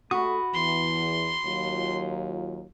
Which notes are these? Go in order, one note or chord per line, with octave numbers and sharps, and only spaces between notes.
A3 F#4 B5 D#6
E2 E3 C6
D#2 F#3 F4